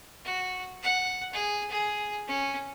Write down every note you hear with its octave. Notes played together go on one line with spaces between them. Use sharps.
F#4
F#5
G#4
G#4
C#4